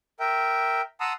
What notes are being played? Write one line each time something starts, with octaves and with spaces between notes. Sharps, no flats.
A#4 E5 G5
F#5 A5 A#5 C6 D#6 E6